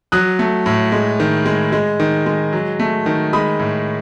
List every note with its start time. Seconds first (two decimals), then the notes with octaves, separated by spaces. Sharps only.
0.12 F#3 D#6 F#6
0.39 A3
0.66 A2
0.92 G#3
1.20 D#3
1.46 G#3
1.73 G#3
2.00 D#3
2.26 G#3
2.53 F#3
2.80 A3
3.06 D#3
3.33 G#3 B5 D#6
3.59 A2